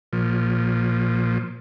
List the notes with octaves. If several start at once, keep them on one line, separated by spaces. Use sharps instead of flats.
A#2 F3